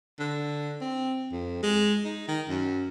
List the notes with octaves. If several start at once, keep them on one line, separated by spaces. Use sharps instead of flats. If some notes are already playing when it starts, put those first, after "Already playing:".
D3
C4
F2
G#3
D#4
D#3
F#2